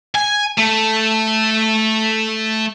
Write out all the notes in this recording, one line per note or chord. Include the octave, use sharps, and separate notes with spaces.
G#5
A3